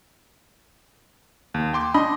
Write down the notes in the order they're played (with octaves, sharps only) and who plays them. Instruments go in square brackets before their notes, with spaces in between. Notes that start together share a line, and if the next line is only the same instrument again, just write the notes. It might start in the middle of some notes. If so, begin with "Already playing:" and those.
[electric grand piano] D#2
G5 C6 D6
[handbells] D4 B5 [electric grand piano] D#5 C6